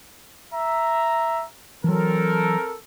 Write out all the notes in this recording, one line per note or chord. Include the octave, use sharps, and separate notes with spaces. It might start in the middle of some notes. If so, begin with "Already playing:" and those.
E5 A#5
E3 F#3 C4 A4 A#4